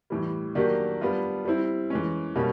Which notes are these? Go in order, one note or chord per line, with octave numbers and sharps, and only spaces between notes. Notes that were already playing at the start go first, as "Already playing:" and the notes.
A2 E3 G3
D#3 F#3 A#3 D4 G4
G3 B3 D4 F4
G3 C4 E4
E3 G#3 C#4
B2 G3 A#3 C#4